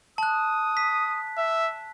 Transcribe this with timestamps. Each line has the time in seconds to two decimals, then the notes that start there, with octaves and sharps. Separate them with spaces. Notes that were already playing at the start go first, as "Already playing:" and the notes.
0.18 A5 D#6 F#6
0.77 B6
1.37 E5